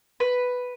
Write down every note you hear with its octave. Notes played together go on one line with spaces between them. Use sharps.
B4